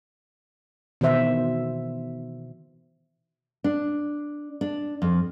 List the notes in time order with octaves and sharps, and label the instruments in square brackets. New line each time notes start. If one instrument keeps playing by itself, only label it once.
[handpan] B2 D#3 E3 C5 E5
[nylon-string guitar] D4
D4
F2